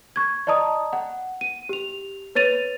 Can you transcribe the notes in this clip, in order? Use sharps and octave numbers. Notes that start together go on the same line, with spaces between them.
C#6 G#6
D5 D#5 A5 A#5 D#6
F#5
D#7
G4 F7
B4 C#5 A6 D#7 F7